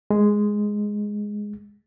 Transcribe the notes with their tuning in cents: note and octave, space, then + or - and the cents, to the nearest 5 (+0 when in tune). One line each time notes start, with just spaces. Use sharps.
G#3 +0